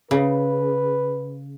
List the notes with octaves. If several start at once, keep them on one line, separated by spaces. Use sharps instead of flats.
C#3 B4